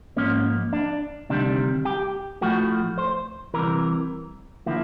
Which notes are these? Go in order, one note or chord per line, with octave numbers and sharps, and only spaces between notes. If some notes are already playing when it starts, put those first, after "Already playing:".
G#2 F3 A#3 C#4
D4
D2 C3 D#3 G3 D4
G4
A2 F3 A3 F#4
C5
C2 C3 E3 A#4
D3 F3 A#3 E4